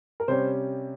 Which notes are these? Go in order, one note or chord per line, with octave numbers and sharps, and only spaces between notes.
A#4
C3 G3 C#4 C5